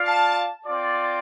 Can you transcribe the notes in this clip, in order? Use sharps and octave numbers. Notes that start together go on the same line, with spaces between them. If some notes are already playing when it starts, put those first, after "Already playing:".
Already playing: F4 D5 F5
A5
C4 F4 D5